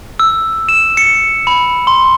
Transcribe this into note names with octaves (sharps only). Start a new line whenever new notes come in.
E6
E7
C#7
B5
C6